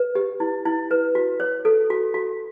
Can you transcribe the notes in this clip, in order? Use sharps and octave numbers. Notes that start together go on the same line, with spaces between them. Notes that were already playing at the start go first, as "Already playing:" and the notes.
Already playing: B4
G4
E4
E4
B4
F#4
C#5
A4
F#4
F#4